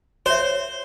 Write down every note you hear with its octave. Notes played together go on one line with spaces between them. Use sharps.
C5 C#5 E5